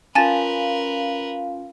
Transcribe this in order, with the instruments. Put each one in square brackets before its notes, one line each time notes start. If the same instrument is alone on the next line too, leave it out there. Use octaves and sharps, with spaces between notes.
[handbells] C#4 F4 [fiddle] A#4 B4 [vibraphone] F5 [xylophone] G#5 A5 A6